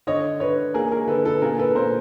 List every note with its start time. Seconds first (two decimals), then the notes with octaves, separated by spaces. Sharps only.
0.07 D3 C#5 D#5
0.40 D3 B4 C#5
0.74 A#3 G#4 A#4
0.92 G#4 A#4
1.08 D3 A4 B4
1.25 A4 B4
1.42 A#2 G#4 A#4
1.58 A4 B4
1.75 A#2 A#4 C5